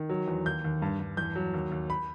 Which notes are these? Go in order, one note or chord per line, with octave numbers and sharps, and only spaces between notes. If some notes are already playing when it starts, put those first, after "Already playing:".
Already playing: D#3
F#3
E2
D#2 G6
D#2
G2
G2
E2 G6
F#3
D#2
D#2
B5